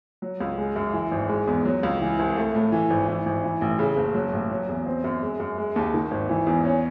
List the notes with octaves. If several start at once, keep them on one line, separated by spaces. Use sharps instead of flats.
F#3
C#2
G#3
F#2
E3
G#1
G#3
E2
F#3
C#2
E3
C2
A3
A2
E3
G#1
E3
G#1
E3
A1
C#3
F#1
F#3
A1
F#3
E2
C4
F#2
G#3
F#2
G#3
D#2
D#3
G#1
E3
E2
C#4